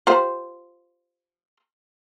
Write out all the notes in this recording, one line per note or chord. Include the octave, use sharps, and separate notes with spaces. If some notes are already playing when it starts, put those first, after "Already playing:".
F4 G4 C5